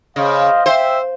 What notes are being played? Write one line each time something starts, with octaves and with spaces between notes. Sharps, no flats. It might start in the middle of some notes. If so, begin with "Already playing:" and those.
C#3 C5 D#5 F5
C5 E5 G5